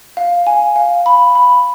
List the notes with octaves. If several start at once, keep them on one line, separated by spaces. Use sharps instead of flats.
F5
G#5
F5
B5
B5